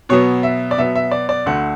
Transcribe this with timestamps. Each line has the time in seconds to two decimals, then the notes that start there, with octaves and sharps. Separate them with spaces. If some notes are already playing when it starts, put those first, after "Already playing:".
0.09 B2 F#3 B3 C#5
0.43 E5
0.71 D5
0.78 B2 F#3 B3 E5
0.96 E5
1.11 D5
1.29 D5
1.46 D2 D3 A3 F#5